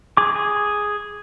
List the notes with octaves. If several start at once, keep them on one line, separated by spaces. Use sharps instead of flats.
G#4 D6
G#4